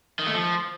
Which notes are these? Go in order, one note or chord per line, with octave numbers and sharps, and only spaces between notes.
D#3
A3
F3